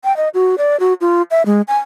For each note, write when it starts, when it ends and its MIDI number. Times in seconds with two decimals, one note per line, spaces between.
0.04 0.15 79
0.17 0.29 75
0.34 0.55 66
0.58 0.79 74
0.80 0.93 66
1.01 1.22 65
1.31 1.43 76
1.46 1.62 56
1.68 1.78 80